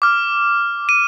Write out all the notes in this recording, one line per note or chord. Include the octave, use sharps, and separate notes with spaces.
D6 F6
D#7